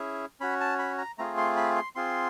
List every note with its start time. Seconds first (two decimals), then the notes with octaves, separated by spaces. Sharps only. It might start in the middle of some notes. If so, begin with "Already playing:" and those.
Already playing: C#4 E4 G#4
0.40 C#4 F#4 B5
0.60 A5
0.79 B5
0.98 A#5
1.19 A3 C4 F4 G#4 A#5
1.37 C6
1.57 B5
1.76 C6
1.95 C4 F4 G#4 C6